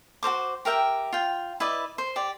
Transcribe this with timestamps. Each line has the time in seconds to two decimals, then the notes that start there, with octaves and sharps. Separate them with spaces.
0.23 F#4 A#4 C5 D6
0.65 G4 A#4 E5 G5
1.13 F4 G5
1.60 E4 B4 D5 D#5
1.98 C5
2.16 G4 D5